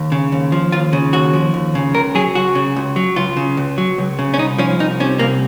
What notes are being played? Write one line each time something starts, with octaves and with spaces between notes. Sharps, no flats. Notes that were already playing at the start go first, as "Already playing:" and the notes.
Already playing: D#2
C#3
D#2
F3
D#2 F4
C#3
D#2 F#4
F3
D#2
C#3
C#2 A#4
F#3 G#4
C#2 F#4
C#3
C#2
F#3
C#2 F4
C#3
C#2
F#3
C#2
C#3
C#4
C2 D#4
F3 C#4
C2 D#4
C3 C#4
C2 A#3